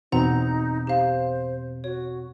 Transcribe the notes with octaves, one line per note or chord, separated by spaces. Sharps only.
E2 B2 C4 D#4 F#5 A#5
G4 C5 F5
F#4 C#5